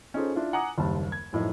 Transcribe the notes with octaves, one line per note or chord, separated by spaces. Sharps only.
C#4 D#4 F4 G#4 A4 C5
D4 E4 F4
F#5 G#5 A#5 D6 D#6
F#1 D#2 G3 A5
G#6
F#2 A2 F3 D#4